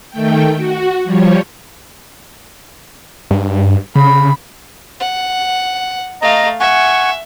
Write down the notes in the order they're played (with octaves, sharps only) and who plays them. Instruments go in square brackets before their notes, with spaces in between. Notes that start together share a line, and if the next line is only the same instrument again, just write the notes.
[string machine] D#3 A3 G5
F#4
F3 G3 C#5
[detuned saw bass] G2
[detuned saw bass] C#3 [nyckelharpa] B5
[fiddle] F#5
[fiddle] A3 F5 [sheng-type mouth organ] D#5 A#5
[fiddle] E5 [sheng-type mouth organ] F#5 G#5 C#6